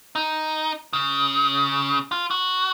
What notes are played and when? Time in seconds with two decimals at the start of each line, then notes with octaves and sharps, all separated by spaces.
0.15 D#4
0.93 C#3
2.12 F4
2.31 F#4